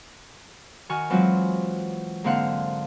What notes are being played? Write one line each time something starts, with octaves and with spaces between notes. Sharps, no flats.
D#3 F#4 G#5 C#6 F6
E3 F#3 G#3 C4 F4 F#4
G#2 D3 A#3 C4 F5 F#5